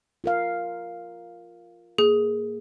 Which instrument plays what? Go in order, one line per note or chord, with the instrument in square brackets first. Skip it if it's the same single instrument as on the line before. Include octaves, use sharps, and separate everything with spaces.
[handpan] F4 A#4 F5
[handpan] A#3 [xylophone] G#4